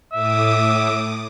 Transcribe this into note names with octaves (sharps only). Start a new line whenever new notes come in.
A2 E5 D6 D#6